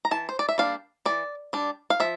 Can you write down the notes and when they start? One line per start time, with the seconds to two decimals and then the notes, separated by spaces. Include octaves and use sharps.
0.05 A#5
0.11 E3 A5
0.29 C5
0.39 D5
0.49 E5
0.58 G3 A#3 D4 F5
1.06 E3 D5
1.53 G3 D4
1.90 F5
2.00 F3 E5